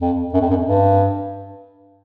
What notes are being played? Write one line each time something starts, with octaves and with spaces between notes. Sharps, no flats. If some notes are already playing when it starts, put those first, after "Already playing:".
F2
F#2
F2
F#2
G2